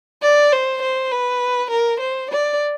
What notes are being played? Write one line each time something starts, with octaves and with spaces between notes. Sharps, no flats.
D5
C5
C5
B4
A#4
C5
D5